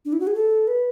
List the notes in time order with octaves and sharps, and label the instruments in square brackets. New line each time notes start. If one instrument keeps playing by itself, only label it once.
[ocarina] D4
E4
F#4
G#4
A4
B4